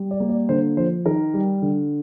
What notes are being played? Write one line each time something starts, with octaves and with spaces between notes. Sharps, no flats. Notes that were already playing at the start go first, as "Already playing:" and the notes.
Already playing: G3
D5
A#3
D5
D3 C5
F3 C5
D#3 A#4
G3
D3